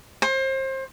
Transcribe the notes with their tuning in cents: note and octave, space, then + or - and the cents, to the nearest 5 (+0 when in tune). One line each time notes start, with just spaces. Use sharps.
C5 +30